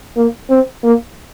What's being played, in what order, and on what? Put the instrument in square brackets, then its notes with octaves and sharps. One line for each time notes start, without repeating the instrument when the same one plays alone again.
[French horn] A#3
C4
A#3